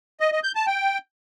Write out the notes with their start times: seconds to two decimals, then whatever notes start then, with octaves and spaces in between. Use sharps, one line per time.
0.20 D#5
0.32 D#5
0.44 G6
0.55 A5
0.67 G5